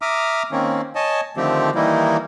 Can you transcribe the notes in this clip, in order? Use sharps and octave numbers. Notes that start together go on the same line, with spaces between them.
E5 A#5 D6 D#6 F6
D#3 A#3 C4 C#4
C#5 D#5 G#5 A5
D3 D#3 F3 A3 C4 G4
D#3 E3 G3 A#3 D#4 E4